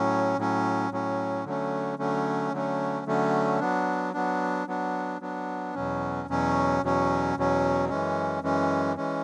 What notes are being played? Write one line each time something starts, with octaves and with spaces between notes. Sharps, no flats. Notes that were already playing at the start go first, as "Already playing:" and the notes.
Already playing: A2 F#3 C#4
A2 F#3 C#4
A2 F#3 C#4
D3 F#3 A3 C#4
D3 F#3 A3 C#4
D3 F#3 A3 C#4
D3 F#3 A3 C#4
F#3 B3 D4
F#3 B3 D4
F#3 B3 D4
F#3 B3 D4
E2 B2 F#3 C#4
E2 B2 F#3 C#4
E2 B2 F#3 C#4
E2 B2 F#3 C#4
F#2 E3 G#3 C#4
F#2 E3 G#3 C#4
E3 G#3 C#4